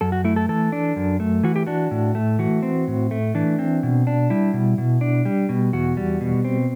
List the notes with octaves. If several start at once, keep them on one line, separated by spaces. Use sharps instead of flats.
F#2 A4
F#4
A3 E4
A4
E3 A4
D4
F#2
A3
E3 F#4
G4
D4 F#4
A2
A3
E3 F#4
C4
A2
A3
E3 D4
C4
B2
D4
G3 E4
B2
B2
D4
G3
B2
E2 F#4
G3
B2
C4